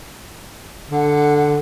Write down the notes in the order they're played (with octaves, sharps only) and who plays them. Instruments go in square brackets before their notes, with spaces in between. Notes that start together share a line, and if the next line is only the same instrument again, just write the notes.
[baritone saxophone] D3 [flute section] F#5